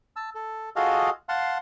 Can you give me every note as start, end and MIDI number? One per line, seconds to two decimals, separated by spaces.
0.16 0.30 81
0.16 0.30 88
0.35 0.70 69
0.76 1.10 65
0.76 1.10 66
0.76 1.10 68
0.76 1.10 69
0.76 1.10 75
0.76 1.10 77
1.29 1.58 77
1.29 1.58 78
1.29 1.58 81
1.29 1.58 84